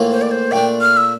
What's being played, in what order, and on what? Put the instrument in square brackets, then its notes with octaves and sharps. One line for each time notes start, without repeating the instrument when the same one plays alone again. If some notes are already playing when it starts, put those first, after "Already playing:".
Already playing: [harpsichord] A2 E3 A#3 F4
[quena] C5
D5
C5
[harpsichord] A#2 A3 D4 [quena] G5
[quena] F6
E6